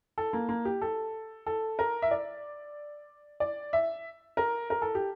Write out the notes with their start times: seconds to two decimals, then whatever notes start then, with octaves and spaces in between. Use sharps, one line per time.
0.18 A4
0.33 A#3
0.49 A#3
0.65 G4
0.82 A4
1.46 A4
1.79 A#4
2.02 E5
2.11 D5
3.40 D5
3.73 E5
4.37 A#4
4.70 A#4
4.82 A4
4.95 G4